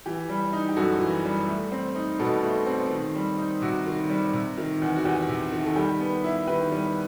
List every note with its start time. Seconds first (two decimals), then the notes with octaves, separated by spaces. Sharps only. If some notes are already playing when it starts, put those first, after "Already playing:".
0.06 E3 G4
0.29 G3
0.53 D#4
0.68 G4
0.76 F#2 F#4 A4
1.00 E3
1.24 G3
1.48 A3
1.72 C4
1.95 D#4
2.19 B2 F#4 A4
2.44 A3
2.66 C4
2.91 D#3
3.15 G3
3.38 D#4
3.62 C3 F#4
3.86 D#3
4.10 G3
4.33 C3
4.58 D#3
4.82 E2
4.96 F#4
5.05 E2 G4
5.29 C3
5.52 D#3
5.66 A4
5.76 G3 G4
6.00 B3
6.24 E4
6.47 D#3 G4 B4
6.71 G3